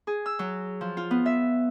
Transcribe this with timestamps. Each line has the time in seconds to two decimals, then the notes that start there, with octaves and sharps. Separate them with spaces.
0.07 G#4
0.26 E6
0.39 F#3
0.81 F3
0.97 F4
1.11 B3
1.26 E5